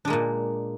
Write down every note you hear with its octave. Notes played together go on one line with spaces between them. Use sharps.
A#2 G#3 A#3 D4